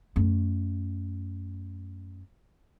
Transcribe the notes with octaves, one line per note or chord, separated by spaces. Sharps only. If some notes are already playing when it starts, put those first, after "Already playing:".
F#2 A3